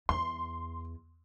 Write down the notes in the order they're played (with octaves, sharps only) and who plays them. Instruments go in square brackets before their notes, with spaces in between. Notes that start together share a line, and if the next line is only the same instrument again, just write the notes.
[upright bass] E2 [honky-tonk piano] C6